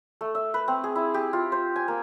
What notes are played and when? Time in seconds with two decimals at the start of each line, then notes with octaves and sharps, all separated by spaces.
0.21 A3
0.35 E5
0.54 B4
0.68 C4
0.84 G#4
0.96 E4
1.14 G4
1.33 F4
1.52 C5
1.76 G#5
1.88 A#3